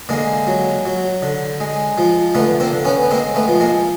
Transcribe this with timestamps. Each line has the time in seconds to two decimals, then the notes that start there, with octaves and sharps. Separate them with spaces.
0.09 D3 G#3 A#3
0.47 F#3
0.86 F#3
1.23 D3
1.60 G#3
1.98 F3
2.35 D3 A3 B3
2.60 A#3 C4
2.73 D3
2.85 B3 C#4
3.03 B3
3.11 G#3 A#3 C4
3.35 A3 B3
3.48 F3
3.60 G#3 A#3